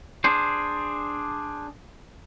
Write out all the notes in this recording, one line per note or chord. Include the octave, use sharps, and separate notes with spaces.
D4 G#4 C5